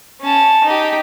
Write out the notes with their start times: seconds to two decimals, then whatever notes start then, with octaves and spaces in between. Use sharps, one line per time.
0.21 C#4 A5
0.64 D#4 G4